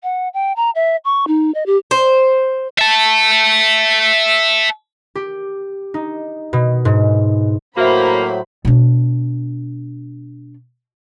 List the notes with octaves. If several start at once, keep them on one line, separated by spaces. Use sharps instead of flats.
F#5
G5
A#5
E5
C#6
D#4
D#5
G4
C5
E5 A5
G4
D#4
B2
G#2
A2 F#3 A#3 F#4 C5 E5 B5
B2 D4